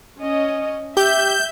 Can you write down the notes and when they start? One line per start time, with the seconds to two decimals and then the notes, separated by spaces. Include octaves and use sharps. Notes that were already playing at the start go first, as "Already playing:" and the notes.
0.18 C#4 D#5
0.97 G4 E5 G6